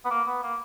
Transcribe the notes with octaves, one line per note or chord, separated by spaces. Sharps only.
B3
A#3
B3
A#3